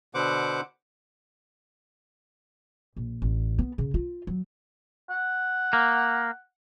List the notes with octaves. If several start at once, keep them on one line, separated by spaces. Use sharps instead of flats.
B2 D3 B3 C5 F#5 D6
A#1
A1
B3
C#3
F4
F#3
F#5
A#3